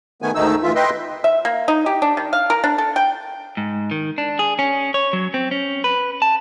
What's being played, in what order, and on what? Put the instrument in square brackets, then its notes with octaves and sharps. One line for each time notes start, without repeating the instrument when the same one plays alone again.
[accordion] D#3 A3 B3 G#5
D2 G#2 D#3 A3 D#4 E6
D2 E3 F4 E5
B4 D#5 E5 G5 C6
[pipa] E5
A#3
D#4
G4
D4
D#3
F5
A#4
D4
A4
G5
[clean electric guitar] G#2
D#3
D4
G#4
C#4
C#5
F#3
C4
C#4
B4
A5